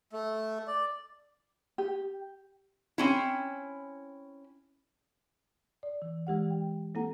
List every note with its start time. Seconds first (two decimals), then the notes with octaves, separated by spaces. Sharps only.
0.12 A3
0.67 D5
1.78 G4
2.98 C4 C#4 E4
5.83 D5
6.02 E3
6.27 E3 G#3 G4 F#5
6.50 G5
6.95 A#3 C4 E4 A4 F#5 A#5